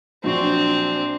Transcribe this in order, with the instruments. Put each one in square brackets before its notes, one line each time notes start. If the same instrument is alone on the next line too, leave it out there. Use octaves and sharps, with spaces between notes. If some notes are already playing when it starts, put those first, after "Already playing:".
[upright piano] A#1 F#3 C#6 [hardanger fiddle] C4 D4